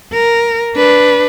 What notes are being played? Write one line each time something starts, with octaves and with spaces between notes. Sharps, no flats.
A#4
D4 B4